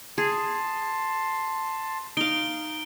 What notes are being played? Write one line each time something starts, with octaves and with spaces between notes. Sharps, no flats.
G#4 A5 C6
D#4 F5 D7 G7